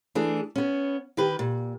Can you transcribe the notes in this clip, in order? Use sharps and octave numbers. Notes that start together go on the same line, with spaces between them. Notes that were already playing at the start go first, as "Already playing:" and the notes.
E3 A3 D4 G#4
B3 C#4
D#3 G4 B4
A#2